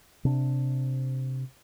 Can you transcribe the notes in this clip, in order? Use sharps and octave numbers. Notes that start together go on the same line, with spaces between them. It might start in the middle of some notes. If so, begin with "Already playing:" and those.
C3 D4